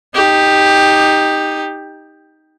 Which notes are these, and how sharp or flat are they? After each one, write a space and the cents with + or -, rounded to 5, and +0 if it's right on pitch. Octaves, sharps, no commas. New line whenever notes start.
D#4 +0 G4 +10